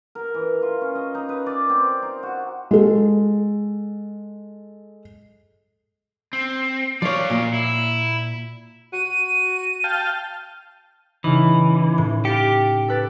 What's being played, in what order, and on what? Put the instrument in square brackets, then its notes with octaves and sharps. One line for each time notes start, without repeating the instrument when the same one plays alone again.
[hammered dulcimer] A#4
E3
F4
C#4
D#5
D#4
B4
D5
C4
D#4
F#4
[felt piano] G#3 A4
[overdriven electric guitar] C4
[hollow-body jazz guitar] F3 C#5 [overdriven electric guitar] D5 F5
[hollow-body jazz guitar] A#2
[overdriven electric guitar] E4
[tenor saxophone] F#4 [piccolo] D#7
[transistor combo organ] F5 G5 A5
[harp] C#3 D#4 [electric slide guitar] E3
[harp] A2
[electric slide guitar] G4 [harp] F5 A6 C#7
[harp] A4 B4 A6